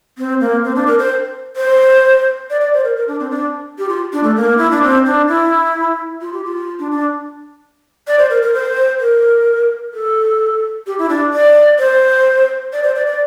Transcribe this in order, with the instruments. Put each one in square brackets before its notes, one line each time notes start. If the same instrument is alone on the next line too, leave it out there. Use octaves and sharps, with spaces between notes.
[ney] C4
A#3
C4
D4
A#4
C5
C5
D5
D5
C5
A#4
A#4
D4
C4
D4
G4
F4
D4
A3
A#3
E4
D4
C4
D4
E4
F4
G4
F4
D4
D4
D5
C5
A#4
A#4
C5
A#4
A4
G4
E4
D4
D5
C5
D5
C5
D5
D5